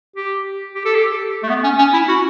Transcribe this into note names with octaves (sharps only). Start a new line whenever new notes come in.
G4
G4
A4
G4
A3
B3
C#4
C#4
E4
F#4